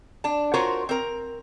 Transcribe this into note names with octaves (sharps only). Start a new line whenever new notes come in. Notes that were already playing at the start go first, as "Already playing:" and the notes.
D4 A5
F4 F#4 A#4 C5 C#5
C4 A#4